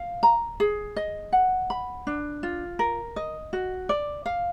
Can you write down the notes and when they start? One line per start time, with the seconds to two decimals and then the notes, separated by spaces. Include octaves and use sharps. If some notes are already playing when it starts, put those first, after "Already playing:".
Already playing: F5
0.23 A#5
0.60 G#4
0.96 D#5
1.32 F#5
1.70 B5
2.07 D4
2.43 F4
2.79 A#4
3.16 D#5
3.53 F#4
3.89 D5
4.26 F5